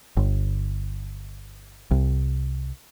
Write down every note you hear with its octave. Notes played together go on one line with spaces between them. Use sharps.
G1
C2